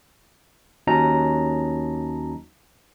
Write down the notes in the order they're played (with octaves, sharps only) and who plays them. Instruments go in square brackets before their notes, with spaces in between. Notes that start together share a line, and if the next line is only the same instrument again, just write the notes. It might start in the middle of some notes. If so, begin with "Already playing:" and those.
[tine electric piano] D#2 F#3 C#4 D#4 A5 A#5